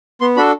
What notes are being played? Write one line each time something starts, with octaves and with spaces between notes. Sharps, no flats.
B3 C6
D4 F#4 A4 B5